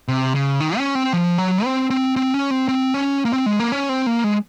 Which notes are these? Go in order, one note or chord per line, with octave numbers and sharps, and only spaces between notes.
C3
C#3
D#3
C#4
C4
F3
F#3
C4
C4
C4
C#4
C4
C4
C#4
A#3
C4
G#3
A#3
C#4
C4
A#3
G#3